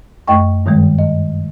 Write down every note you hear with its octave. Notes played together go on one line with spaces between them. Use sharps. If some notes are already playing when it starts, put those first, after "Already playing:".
F#2 A3 D#5 G5 C#6
G2 D#3 G3 G#3
D#5